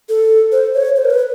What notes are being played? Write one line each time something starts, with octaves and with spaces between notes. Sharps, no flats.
A4
C5
C#5
C5
A#4
B4